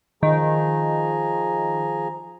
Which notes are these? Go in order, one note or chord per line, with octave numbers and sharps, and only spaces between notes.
D#3 F3 G#4 A#5